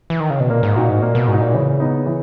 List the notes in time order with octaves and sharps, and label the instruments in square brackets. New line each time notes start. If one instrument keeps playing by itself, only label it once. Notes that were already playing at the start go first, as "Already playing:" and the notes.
[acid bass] E3
D#3
C#3
B2
[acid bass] A#2 [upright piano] A#3
[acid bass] G#2
[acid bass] A#2 [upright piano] D#4 F#4
[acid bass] G#2
[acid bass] A#2 [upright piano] A#3
[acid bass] B2
[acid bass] G#2 [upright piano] D#4 F#4
[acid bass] A#2
[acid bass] C#3 [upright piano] E3
[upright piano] B3 D#4
E3